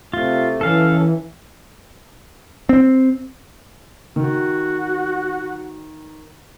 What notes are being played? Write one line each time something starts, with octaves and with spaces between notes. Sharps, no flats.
C3 A3 F4
E3 C#4 A4 F5
C4
D#3 F#4